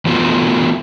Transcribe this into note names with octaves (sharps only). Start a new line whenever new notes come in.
E3 F#3 A3 B3 F4 F#4